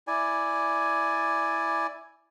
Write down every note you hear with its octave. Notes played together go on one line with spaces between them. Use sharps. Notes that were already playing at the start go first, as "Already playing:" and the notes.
E4 D5 G#5